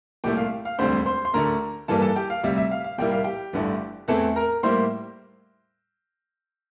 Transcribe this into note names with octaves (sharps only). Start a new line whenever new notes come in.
C2 A#2 A3 E4 G4 G5
F5
F5
E1 D2 D3 G3 C4 C5 C6
C5 C6
C6
D2 D3 A3 A#4 A#5
G2 E3 G3 A#3 A4 A5
A4 A5
G4 G5
F5
D2 C3 G3 E5
E5
F5
F5
C2 A#2 G3 A#3 E4 G5
F5
G4 G5
G1 G2 D3 A3 E4
E2 E3 A3 C4 E4 A4 A5
A#4 A#5
A2 G3 A#3 E4 C5 C6